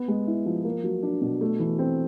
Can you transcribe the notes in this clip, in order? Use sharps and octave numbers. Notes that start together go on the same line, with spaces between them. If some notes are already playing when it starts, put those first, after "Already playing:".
Already playing: B3
G#3
E4
F3
A#3
F#3
D4
B2
A3
E3
C4